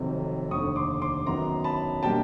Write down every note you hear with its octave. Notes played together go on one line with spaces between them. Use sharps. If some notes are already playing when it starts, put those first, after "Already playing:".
Already playing: F1 F2 C3 D#3 F#3
F1 D#2 D3 C#6 D#6
C6 D6
C6 D6
F#2 D#3 F#3 B3 A#5 C6
A5 B5
B2 G3 A#3 D4 G5 A5